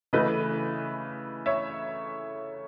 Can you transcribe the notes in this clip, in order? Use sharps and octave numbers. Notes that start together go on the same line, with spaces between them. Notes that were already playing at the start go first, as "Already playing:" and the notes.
C#3 E3 A3 B4 D#5
C#5 E5